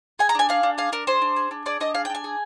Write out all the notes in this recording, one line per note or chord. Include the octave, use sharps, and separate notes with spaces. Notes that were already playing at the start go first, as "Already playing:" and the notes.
G#4 G#5
A#5
D4 G#5
G#4 F5
D4
G#4 F5
D4 A#4
G#4 C5
D4
G#4
D4
G#4 D5
D4 D#5
G#4 F5
G5
D4 G#5
G#4